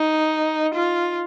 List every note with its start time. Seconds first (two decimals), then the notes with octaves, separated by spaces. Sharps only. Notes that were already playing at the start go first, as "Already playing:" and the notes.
Already playing: D#4
0.75 F4